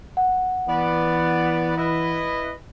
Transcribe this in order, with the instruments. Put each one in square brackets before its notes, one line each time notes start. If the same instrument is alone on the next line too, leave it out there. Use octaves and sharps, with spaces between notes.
[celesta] F#5
[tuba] E3 [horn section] B3 D5
[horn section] E4 B4 D#5